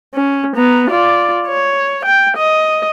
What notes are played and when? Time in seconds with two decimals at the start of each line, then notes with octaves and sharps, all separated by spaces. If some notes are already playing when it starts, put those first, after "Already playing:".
0.14 C#4
0.56 B3 A#5
0.91 F4 D5
1.47 C#5
2.05 G5
2.37 D#5